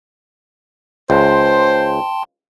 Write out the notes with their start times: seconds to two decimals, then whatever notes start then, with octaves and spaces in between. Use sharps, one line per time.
1.10 C#2 C5 G5 A5 C6